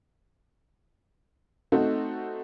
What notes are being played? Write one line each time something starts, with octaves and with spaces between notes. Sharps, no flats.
A3 C4 D#4 F#4